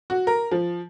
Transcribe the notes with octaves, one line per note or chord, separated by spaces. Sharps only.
F#4
A#4
F3